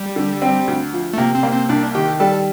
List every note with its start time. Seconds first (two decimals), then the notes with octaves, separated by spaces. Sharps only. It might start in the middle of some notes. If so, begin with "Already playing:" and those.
Already playing: G3
0.16 D3
0.42 C4
0.68 D2
0.93 F3
1.13 A3
1.18 C3 A#3
1.35 C4
1.43 A#3
1.52 C4
1.69 C2 D4
1.95 D#3 G4
2.20 G3 A4